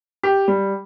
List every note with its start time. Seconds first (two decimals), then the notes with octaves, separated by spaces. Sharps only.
0.23 G4
0.48 G3